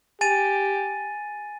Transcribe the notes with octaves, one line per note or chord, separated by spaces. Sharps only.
G4 G#5 A6 D#7